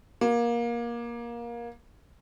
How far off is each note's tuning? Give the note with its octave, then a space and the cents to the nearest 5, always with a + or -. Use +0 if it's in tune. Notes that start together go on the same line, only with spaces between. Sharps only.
A#3 +20